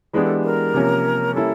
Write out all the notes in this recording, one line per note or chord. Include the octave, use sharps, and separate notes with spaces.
E3 G#3 B3 D4 G4 G#4
A4
A#4
C3 F3 A#3 C#4
G3 A#3 C#4 E4 A4